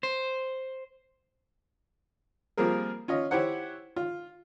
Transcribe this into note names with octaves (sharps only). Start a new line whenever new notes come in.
C5
F3 G3 A#3 C4 G#4 A#4
C#4 F4 D#5
E4 G4 C5 C#5 F#5
F4